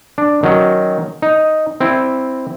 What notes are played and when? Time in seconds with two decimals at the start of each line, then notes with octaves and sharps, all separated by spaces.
0.18 D4
0.43 D#3 F#3 C#4
1.22 D#4
1.81 C4 E4